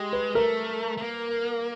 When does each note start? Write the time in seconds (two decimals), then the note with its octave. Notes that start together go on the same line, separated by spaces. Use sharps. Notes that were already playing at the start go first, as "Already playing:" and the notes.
Already playing: G#3 G4
0.13 B4
0.35 A3 A#4
0.97 A3
1.02 A#3